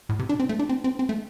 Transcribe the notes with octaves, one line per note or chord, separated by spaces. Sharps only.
A2
C3
D4
C4
A3
D4
C4
C4
C4
A3